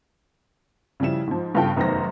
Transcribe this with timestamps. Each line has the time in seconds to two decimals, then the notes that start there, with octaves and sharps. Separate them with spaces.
1.00 C#3 F3 G3 E4 E7
1.27 G#2 F3
1.55 G2 C#3 B3 F4 A4 G5
1.76 F1 F#2 D#3 B3 C5 A#6